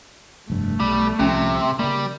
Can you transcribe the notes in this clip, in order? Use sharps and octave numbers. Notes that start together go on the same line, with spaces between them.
F1 G2 A3
B1 G3
C2 C3 F3 C#4
C#3 G3 A#3